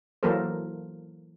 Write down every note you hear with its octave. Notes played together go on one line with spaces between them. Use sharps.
E3 F#3 A#3 A4 A#4 C5